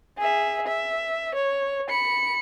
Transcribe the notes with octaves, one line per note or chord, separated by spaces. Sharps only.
G#4 E5
E5
C#5
B5 C#7